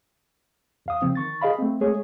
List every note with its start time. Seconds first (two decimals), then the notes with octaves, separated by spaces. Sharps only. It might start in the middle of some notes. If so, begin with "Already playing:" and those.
0.86 E2 F5 D#6
1.02 C#3 F3 C4
1.15 D#3 C#6 A6
1.41 G#4 D#5 F5 B5
1.58 A3 C4
1.81 G#3 A3 G#4 C#5